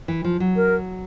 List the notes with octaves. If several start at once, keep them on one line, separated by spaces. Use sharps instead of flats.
E3
F3
F#3
A#4